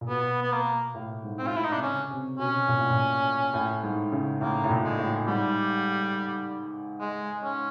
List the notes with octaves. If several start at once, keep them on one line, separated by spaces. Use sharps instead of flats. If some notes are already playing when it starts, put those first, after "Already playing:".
A#2
B2 B3
B3
A#3
A2
G#2
C4
F4
A2 E4
D#4
C3 D4
C#3 C#4
C3
B2 C#4
A#2
A2
A#2
A2
G#2
C#3
A2 A#3
A2
A#2
G#3
A2
G#2 G3
G#3
C#4